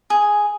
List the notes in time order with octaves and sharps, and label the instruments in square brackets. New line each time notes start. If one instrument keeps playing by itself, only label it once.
[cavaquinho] G#4